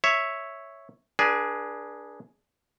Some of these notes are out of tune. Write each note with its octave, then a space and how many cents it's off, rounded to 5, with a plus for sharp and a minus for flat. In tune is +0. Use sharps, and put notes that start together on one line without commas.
C#5 +0 E5 +0
D4 +0 G#4 +0 B4 -45